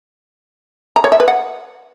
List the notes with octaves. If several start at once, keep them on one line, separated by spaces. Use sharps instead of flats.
A#5
C#5
E5
B4
F#5